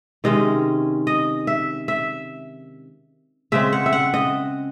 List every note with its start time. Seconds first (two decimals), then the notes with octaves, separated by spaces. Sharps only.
0.24 C3 D#3 G#3 C#4 D#5
1.07 D#5
1.47 E5
1.88 E5
3.52 C#3 G#3 C4 E5
3.73 F#5
3.86 E5
3.93 F#5
4.14 D#5